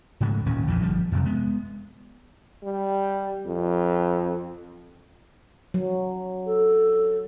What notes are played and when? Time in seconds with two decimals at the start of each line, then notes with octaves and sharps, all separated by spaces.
0.21 G#2 C#3 G#3 A3
0.46 D#1 D#2 A#2 C#4
0.67 A#1 F2 A#2 E3
0.81 G1 F3 G3
1.12 F2 C3 F#3
1.25 G#3 B3
2.63 G3
3.46 F2
5.74 F#3
6.46 A4